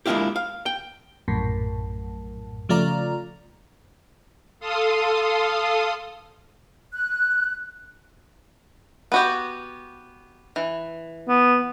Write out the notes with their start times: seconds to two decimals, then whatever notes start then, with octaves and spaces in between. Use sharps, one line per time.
0.06 G#3 A#3 D4 E4 F4 G4
0.36 F5
0.66 G5
1.28 A#1 F#2 A2
2.69 C#3 F3 A3 F4 D5 A#5
4.60 A4 F5 C6 D#6
6.93 F#6
9.12 B3 F#4 G4
10.56 E3
11.28 B3